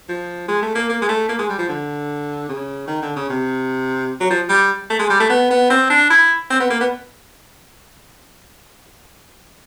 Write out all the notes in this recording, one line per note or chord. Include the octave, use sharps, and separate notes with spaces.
F3
G#3
A3
A#3
A#3
G#3
A3
A#3
G#3
G3
F3
D3
C#3
D#3
D3
C#3
C3
F#3
F3
G3
A3
G#3
G3
A3
B3
B3
C4
D4
E4
C4
B3
A#3
B3